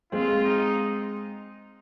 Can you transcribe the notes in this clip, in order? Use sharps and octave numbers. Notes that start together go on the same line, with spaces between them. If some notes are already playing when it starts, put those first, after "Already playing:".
G#3 C4 F4
D#4